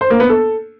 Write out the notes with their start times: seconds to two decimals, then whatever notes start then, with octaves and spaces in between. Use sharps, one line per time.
0.01 C5
0.10 A#3
0.20 B3
0.29 A4